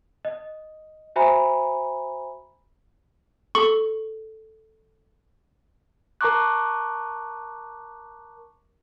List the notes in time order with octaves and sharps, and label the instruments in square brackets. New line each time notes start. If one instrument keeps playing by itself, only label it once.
[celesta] D#5
F#4 C5 E5 G#5 A#5 B5
[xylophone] A4 [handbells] C#6
[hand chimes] A#4 A5 A#5 C#6 D6 F#6